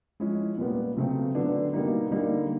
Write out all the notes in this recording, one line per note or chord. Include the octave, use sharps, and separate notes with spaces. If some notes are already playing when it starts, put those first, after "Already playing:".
F3 G#3 C#4 E4
A#2 G3 B3
C#3 F#3 A3 C4
D3 F#3 B3 D4
B2 G3 A#3 D#4
D3 G3 A#3 D#4